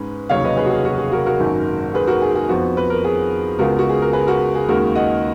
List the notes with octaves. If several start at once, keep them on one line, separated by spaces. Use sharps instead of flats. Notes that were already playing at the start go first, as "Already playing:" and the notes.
Already playing: G#2 G#3 C#4 B4
F1 D#2 C#3 F#3 C#5 F5
B4 D#5
G#4 B4
F#4
G#4
F#4
G#4
F#4 A#4
F#4 A#4
G#1 F#2 D#3 A#3
G#4 B4
F#4 A#4
G#4
G#4
F2 F3 B3 F#4
B4
A#4
G#4
C#2 C#3 G#3 B3 F4 F#4 A#4
F#4
G#4
A#4
G#4 B4
F#4 A#4
G#4
D#2 C#3 G#3 D#4 F#4 A#4
D#5 F#5